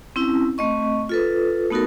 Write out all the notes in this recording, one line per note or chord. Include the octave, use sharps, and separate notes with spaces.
C4 C#4 E4
A3 C4 D#5 C#6
F4 A4 B4
A3 B3 D#4 F#4 A4 A#4